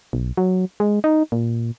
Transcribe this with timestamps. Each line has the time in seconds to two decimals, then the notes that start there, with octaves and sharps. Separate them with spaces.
0.13 B1
0.37 F#3
0.80 G#3
1.04 D#4
1.32 A#2